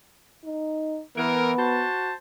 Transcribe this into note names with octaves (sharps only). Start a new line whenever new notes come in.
D#4
E3 B3 A#4
F#4 C5 A5